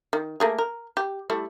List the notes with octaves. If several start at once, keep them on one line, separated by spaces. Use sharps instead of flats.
D#3
A3 A#3 G#4
A#4
G4
G3 A3 E4